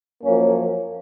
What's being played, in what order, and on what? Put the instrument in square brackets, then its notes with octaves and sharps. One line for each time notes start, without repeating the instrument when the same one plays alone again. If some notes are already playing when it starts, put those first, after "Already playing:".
[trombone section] F#2 F3 A#3 C#4